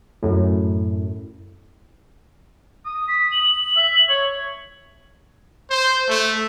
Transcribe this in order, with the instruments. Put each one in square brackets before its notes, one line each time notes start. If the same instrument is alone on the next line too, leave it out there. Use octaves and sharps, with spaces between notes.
[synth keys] F#2 A2
[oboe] D#6
[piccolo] B6
F#7
[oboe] E5
C#5
[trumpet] C5
A3